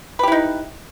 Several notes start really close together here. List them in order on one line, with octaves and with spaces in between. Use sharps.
B4 G4 E4 D#4